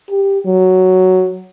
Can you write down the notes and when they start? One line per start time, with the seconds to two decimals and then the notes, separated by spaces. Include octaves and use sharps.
0.10 G4
0.46 F#3